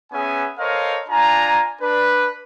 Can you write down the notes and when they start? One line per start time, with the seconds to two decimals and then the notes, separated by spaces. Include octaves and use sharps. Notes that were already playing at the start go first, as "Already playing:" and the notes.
0.12 B3 C#4 G#4 E5 G#5
0.58 A4 A#4 C5 C#5 D#5 F5
1.09 D4 F4 G#5 A#5
1.81 D4 B4